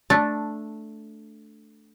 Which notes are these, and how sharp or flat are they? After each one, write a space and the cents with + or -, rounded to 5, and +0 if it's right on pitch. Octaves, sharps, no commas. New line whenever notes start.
A3 -5 D4 +0